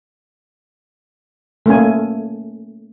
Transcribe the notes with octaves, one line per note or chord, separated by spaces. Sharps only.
A3 A#3 C#4 G#5